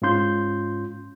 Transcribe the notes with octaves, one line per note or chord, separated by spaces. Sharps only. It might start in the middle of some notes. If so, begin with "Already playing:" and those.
G#2 C#4 F4 C6 G6